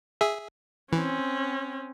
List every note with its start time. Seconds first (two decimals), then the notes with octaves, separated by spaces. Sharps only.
0.21 G#4 E5
0.93 E3 C4 C#4